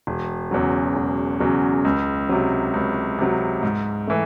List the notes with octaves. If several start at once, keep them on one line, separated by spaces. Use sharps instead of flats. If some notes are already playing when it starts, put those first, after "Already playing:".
E1
E2 C#3 F#3
E1
E2 C#3 F#3
C#2
C3 F#3
C#2
C3 F#3
G#2
E3 A3